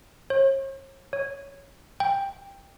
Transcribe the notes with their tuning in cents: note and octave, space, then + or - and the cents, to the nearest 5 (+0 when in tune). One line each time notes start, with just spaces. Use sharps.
C#5 -40
C#5 +5
G5 +10